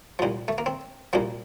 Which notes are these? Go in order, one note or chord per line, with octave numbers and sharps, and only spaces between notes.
C2 A#2 F3
A3
A#3
C4
C2 A#2 F3 A#3